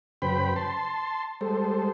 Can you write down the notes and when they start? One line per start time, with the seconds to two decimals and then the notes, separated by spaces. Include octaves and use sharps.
0.22 F#2 C#3 B4 C5 G5 B5
0.56 A5 C6
1.41 G3 G#3 A4 C5